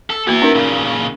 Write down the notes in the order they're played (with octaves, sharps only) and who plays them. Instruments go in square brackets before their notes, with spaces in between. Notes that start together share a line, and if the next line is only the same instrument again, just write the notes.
[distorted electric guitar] A4
[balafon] A#3 F#4 [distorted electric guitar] B3 E4
[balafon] C#4 D#4 A#4
[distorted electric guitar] A#2 C#3